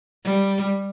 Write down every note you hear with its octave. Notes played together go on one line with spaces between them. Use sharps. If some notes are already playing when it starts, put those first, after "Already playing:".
G3